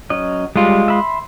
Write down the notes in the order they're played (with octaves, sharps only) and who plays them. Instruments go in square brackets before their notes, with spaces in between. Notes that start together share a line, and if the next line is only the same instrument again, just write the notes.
[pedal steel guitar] F#3 C#4 D#5
[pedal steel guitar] G3 [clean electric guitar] G#3 F4
[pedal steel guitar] E5 B5 C6